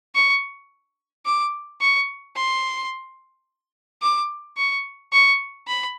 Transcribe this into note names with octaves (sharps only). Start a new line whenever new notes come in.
C#6
D6
C#6
C6
D6
C#6
C#6
B5